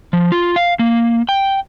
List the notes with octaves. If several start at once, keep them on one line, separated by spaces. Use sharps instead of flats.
F3
F4
F5
A#3
G5